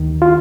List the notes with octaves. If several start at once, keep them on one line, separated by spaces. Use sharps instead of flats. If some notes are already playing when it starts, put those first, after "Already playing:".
Already playing: D#2 D#3
F4